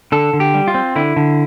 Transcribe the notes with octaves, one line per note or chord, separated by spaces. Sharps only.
D3 A4
D3
G4
G3
F4
C4
D3 E4
D3